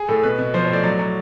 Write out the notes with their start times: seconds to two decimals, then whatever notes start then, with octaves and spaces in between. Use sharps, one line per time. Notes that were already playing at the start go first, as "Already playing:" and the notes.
Already playing: G#4
0.08 A2 A4
0.23 B2 B4
0.39 B2
0.54 F3 C5
0.64 C#5
0.69 A2 D5
0.84 F#3 D5
0.99 F#3